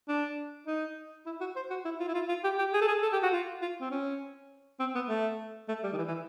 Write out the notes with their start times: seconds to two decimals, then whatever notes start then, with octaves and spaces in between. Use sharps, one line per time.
0.08 D4
0.67 D#4
1.26 E4
1.41 F#4
1.56 C5
1.70 F#4
1.85 E4
2.00 F4
2.08 E4
2.14 F4
2.29 F4
2.44 G4
2.59 G4
2.74 G#4
2.81 A4
2.88 G#4
3.03 A4
3.13 G4
3.23 F#4
3.33 F4
3.62 F4
3.81 C4
3.91 C#4
4.80 C4
4.95 B3
5.09 A3
5.68 A3
5.83 G3
5.93 D#3
5.98 E3
6.08 E3